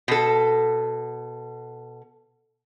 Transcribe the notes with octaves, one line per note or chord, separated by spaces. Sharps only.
B2 A4